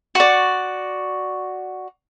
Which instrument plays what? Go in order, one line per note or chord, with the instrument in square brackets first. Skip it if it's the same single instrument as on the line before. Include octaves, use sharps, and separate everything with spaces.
[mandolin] F#4 D5